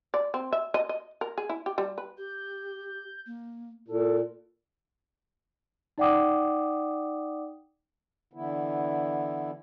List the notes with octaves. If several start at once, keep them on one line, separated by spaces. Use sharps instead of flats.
D5
C4
E5
D#5
D#5
A#4
G#4
E4
G4
G3
B4
G4 G6
A#3
A#2 E4 A4
D#4 D5 F#5 G5 D6 D#6
D3 E3 B3 E4